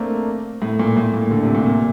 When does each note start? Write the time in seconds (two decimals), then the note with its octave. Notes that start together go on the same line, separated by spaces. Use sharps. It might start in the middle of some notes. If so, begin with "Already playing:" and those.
Already playing: A3 A#3 C4 D4
0.62 A2
0.79 A#2
0.97 A2
1.14 A#2
1.31 D3
1.43 C3
1.55 A#2
1.66 A#2